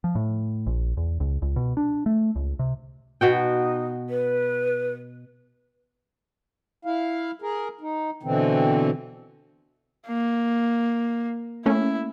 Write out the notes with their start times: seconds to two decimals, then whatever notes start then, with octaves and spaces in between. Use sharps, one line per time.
0.04 F3
0.15 A2
0.67 A#1
0.97 E2
1.20 C#2
1.42 C#2
1.56 B2
1.77 D4
2.06 A3
2.36 C#2
2.59 C3
3.21 B2 D#4 F#4 G5
4.09 B4
6.85 E4 F5
7.42 G#4 A#4
7.81 D#4
8.23 B2 D3 E3 C4
10.07 A#3
11.66 A3 A#3 C#4 E4